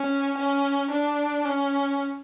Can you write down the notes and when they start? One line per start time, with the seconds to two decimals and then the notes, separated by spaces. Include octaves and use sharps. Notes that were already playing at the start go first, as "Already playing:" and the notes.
Already playing: C#4
0.37 C#4
0.91 D4
1.45 C#4